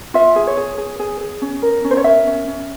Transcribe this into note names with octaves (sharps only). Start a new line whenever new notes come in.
F4 E5
G#4
C#5
G#4
G#4
G#4
G#4
C#4
A#4
C#4
C5
C#5
A#4 E5
C#4
C#4